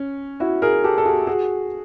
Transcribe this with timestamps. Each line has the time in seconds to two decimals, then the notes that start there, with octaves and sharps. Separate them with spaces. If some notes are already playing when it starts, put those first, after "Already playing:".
Already playing: C#4
0.40 E4 F#4
0.62 G#4 A#4
0.84 G4 A4
0.98 A4
1.06 F#4 G#4
1.27 F#4 G#4